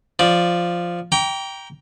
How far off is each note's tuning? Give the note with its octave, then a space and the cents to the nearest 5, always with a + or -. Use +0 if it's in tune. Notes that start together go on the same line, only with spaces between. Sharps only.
F3 +0 D5 +0
G5 +0 A#5 +15 D6 -40